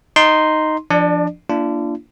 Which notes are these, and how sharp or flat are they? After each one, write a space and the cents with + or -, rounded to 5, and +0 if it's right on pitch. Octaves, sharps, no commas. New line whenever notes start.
D#4 +0 C6 +0
F3 -20 D4 +0 D5 +35
A#3 +0 D4 +0 F4 -40